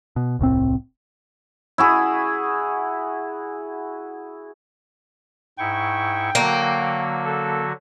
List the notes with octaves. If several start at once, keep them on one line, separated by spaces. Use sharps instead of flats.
B2
D#1 C2 A2 C4
E4 F#4 G#4
G#2 E4 G5 C#6
D3 F#3 A#3 F#4
A4